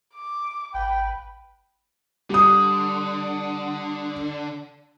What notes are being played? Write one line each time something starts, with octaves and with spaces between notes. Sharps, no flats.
D6
G#1 B4 G5
D3 G3 D#6